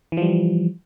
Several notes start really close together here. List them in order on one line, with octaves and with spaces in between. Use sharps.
E3 F3 G3